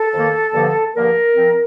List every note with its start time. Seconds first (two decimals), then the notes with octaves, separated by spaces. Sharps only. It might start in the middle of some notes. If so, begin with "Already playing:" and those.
Already playing: A4
0.14 F2 D#3 A#3
0.54 G2 D3 F3 A#3
0.95 G2 D3 F3 A#3 A#4
1.35 A#2 F3 C4